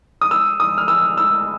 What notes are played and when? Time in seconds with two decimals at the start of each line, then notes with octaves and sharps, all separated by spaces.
0.21 D#6
0.31 E6
0.60 D#6
0.78 F6
0.88 E6
1.18 E6